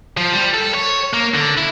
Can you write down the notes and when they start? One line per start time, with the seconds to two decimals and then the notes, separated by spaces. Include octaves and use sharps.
0.17 F3
0.33 G3
0.54 A4
0.74 C#5
1.13 A#3
1.34 D3
1.58 E4